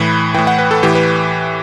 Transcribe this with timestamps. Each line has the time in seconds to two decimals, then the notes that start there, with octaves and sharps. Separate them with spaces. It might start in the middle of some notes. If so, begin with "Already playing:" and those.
Already playing: A2 E3 B5
0.34 A2 E3 G5
0.47 F#5
0.59 B4
0.71 A4
0.83 A2 E3 G4
0.95 B4